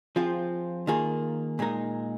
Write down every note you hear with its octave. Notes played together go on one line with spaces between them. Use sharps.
F3 C4 F4 G#4
D#3 A#3 F4 G#4
A#2 G#3 D#4 A#4